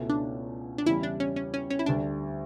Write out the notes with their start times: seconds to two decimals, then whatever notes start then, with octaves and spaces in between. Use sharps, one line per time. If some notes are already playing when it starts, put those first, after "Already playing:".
Already playing: C#2 B2 A3 C#4 E4
0.09 D4
0.78 D4
0.86 E2 C#3 G3 E4
1.03 D4
1.20 C#4
1.36 C#4
1.54 C#4
1.70 C#4
1.79 E4
1.86 D2 D3 G3 D4